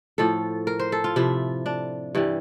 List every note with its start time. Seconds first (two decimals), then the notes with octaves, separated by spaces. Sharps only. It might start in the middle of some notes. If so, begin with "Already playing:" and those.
0.18 A2 F3 A4
0.67 A#4
0.80 C5
0.92 A4
1.04 F4
1.16 C3 F3 E4
1.66 D4
2.15 G2 E3 G3